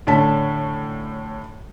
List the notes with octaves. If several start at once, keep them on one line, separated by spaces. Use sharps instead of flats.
A2 D3 C#4 A5 B6